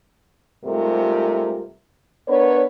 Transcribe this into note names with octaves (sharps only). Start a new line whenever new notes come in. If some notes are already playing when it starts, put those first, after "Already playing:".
G#2 C3 G3 A3 F4 A#4
B3 D4 A#4 B4 C#5